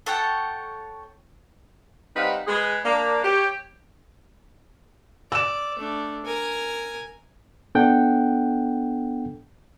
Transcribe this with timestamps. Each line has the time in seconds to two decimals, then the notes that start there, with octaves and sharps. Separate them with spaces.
0.06 A4 C#5 F#5 G5
2.16 G3 C4 D#4 B4 F5 F#5
2.47 G#3 G#4 B4
2.85 A#3 D4
3.24 G4 C#5
5.32 D5 E6 E7
5.77 A3 D4
6.25 A#4 G#5
7.75 B3 D4 A4 F#5 G5